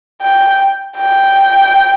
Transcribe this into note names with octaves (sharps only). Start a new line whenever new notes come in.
G5
G5